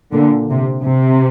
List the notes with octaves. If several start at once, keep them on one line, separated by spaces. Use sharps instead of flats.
A#2 D3
C3
C3